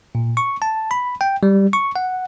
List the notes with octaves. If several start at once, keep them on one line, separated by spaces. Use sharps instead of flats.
A#2
C#6
A5
B5
G5
G3
C#6
F#5